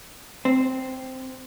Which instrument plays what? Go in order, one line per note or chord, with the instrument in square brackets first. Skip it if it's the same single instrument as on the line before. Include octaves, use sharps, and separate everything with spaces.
[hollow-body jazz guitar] C4